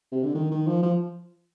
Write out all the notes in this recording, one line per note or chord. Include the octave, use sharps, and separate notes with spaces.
C3
D3
D#3
D#3
F3
F3